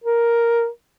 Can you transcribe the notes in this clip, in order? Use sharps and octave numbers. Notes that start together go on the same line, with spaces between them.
A#4